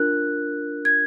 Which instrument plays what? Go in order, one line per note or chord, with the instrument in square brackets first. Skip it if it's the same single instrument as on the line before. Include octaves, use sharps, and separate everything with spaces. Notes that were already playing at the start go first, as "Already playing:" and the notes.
Already playing: [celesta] D4 F4 A#4 F#6
G#6